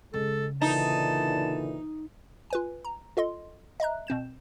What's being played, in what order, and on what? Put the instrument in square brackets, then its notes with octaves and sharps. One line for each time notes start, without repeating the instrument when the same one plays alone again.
[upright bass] C#3 [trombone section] G#3 [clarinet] A4
[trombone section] A#2 D3 E3 [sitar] D#4 [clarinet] A5
[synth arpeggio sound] F4 B4 G#5
A#5
F4 A4 D#5 C6
D#5 E5 A#5 F#6
B2 C4 G6 E7